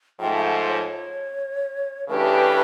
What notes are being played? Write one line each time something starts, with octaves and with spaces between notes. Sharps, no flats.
G#2 F3 A3 G5
F5
F#5
C#5
C#3 E3 A3 D4 G4 B4